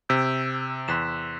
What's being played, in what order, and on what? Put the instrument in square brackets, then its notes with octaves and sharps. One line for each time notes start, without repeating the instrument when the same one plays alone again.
[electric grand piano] C3 [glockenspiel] E6 G6 B6 D7
[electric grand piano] E2 [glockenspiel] C6 F#6 B6 E7